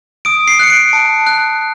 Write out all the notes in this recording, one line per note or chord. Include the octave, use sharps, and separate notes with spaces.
D#6 D7
C7
F#6 C#7
D7
A5
F#6